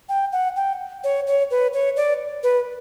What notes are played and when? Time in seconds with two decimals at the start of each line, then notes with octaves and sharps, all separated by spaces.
0.09 G5
0.32 F#5
0.56 G5
1.04 C#5
1.27 C#5
1.51 B4
1.73 C#5
1.97 D5
2.43 B4